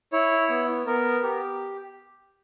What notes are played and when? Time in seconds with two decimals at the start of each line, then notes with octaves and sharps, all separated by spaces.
0.12 E4 C#5
0.49 B3
0.87 B3 A#4
1.23 G4